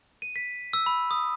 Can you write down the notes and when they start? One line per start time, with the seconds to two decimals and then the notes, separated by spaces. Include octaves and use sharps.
0.22 D#7
0.36 B6
0.73 E6
0.86 B5
1.11 D#6